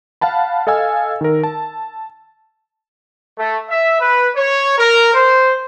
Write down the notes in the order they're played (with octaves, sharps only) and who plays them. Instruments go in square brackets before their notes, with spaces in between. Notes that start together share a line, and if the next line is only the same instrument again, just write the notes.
[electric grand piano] F5 F#5 A5 B5
A4 D#5 F5 G#5 E6
D#3 A#4
A5
[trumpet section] A3
E5
B4
C#5
A#4
C5